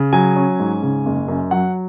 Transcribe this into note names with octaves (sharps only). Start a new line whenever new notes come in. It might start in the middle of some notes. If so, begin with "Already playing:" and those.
Already playing: C#3
F#3 G#5
C#4
G#2
C#3
F#1
F#2
F#3 F#5